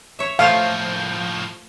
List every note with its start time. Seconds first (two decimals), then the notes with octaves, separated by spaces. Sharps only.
0.19 C#5 E5
0.39 A2 F3 A3 F4 C5 F5